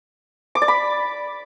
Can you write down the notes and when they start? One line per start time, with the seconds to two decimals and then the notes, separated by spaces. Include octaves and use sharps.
0.55 D6
0.62 D5
0.68 B5